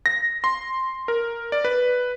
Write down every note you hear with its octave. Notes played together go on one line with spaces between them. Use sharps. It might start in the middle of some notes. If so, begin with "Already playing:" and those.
A#6
C6
A#4
D5
B4